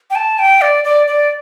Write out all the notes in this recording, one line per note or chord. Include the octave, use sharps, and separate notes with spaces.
G5
A5
G5
D5
D5
D5